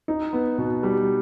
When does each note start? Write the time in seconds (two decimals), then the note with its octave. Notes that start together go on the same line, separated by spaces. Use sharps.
0.08 D#4
0.33 B3
0.58 B2
0.83 G3